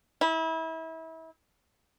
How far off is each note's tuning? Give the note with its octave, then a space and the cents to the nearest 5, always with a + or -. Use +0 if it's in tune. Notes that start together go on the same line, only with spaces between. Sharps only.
E4 -30